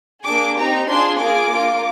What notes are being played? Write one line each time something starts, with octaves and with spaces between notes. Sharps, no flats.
A#3 D4 G#4 D6
C4 D#4 G4 A#5
D4 F4 G#4 C6
A#3 F4 G#4 D6
A#3 D4 F4